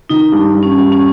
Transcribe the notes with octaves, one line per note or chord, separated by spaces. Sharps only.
D#3 D#4
G2 D4
G2
C#4
G2
C#4